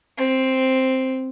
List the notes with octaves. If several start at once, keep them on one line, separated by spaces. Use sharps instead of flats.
C4